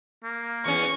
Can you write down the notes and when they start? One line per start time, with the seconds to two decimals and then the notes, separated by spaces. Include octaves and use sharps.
0.24 A#3
0.66 E2 C#4 C#6